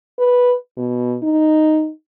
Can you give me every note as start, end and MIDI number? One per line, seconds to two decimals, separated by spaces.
0.19 0.55 71
0.77 1.17 47
1.23 1.90 63